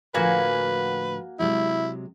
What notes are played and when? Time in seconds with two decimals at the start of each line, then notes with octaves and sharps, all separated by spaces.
0.14 A2 D3 F3 A#3 F#4 B4 G#5
1.39 C3 F#3 G#3 E4